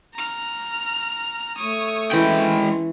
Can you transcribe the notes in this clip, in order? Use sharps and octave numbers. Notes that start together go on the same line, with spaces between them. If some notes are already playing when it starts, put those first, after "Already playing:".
A#5 F6
A3 C#5 D#6
E3 G#3 C#4 G5 B5